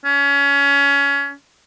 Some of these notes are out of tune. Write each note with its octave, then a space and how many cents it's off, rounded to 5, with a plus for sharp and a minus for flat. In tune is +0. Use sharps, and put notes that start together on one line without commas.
C#4 +25